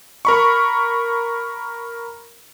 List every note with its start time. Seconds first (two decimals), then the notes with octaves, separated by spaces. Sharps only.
0.25 A#4 B5 C#6